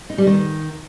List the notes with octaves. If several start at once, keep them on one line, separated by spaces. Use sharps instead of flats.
D#4
G3
D#3